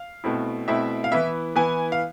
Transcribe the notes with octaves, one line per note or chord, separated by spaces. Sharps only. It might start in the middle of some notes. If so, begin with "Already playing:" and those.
Already playing: F5
B2 A3 C4 E4
B2 A3 C4 E4 E5
F5
E3 B3 E4 E5
E3 B3 E4 G#5
F5